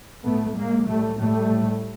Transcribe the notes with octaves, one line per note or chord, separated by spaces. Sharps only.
A2 A3 B3
A2 G#3 A#3
A2 G3 A3
A2 G3 A3
A2